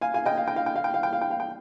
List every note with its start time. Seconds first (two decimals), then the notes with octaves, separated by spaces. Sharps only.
0.01 F5 G#5
0.14 F5 G#5
0.26 D#5 G5
0.38 F5
0.48 G5
0.56 F5
0.66 G5
0.76 F5
0.84 G5
0.94 F5
1.03 G5
1.13 F5
1.21 G5
1.31 F5
1.40 G5